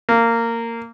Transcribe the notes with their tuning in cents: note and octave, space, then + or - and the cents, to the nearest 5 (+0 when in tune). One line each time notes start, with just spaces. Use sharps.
A#3 -15